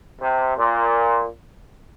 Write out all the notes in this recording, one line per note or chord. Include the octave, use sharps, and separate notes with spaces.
C3
A#2